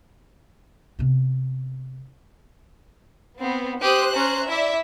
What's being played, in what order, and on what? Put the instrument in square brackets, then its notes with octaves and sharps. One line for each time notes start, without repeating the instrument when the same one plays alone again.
[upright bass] C3 B3
[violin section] B3 [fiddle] C4
[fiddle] G4 D#6 [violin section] C5 F#6
[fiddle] C#4 A#5
[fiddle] E4 [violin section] D5 E5